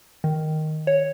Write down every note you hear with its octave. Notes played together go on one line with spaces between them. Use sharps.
D#3
C#5